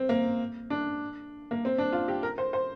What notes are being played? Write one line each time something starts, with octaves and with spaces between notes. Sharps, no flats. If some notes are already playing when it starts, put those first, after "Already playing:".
Already playing: C4
A#3
D4
A#3
C4
D4
F4
G4
A#4
C5
C5